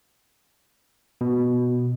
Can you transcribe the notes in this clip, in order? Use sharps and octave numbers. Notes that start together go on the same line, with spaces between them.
B2